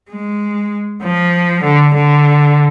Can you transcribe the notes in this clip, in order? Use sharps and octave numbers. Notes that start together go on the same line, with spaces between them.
G#3
F3
D3
D3